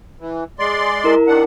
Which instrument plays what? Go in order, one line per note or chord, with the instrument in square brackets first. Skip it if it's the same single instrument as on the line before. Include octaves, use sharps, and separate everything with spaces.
[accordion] E3
G#3 D5 C6
[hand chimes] E4 A#4
[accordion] D#3 D4 F#5